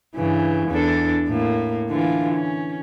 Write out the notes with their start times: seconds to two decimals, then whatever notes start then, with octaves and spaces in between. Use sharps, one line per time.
0.15 G2 C#3 E3
0.69 E2 D4 A4
1.27 A2 A#3
1.89 D3 E3 F4
2.34 C#4